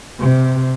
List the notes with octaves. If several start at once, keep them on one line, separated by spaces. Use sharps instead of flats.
C3